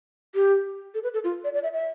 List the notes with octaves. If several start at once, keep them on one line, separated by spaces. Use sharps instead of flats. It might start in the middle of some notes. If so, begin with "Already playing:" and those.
G4
A4
B4
A4
F4
D5
D5
E5
E5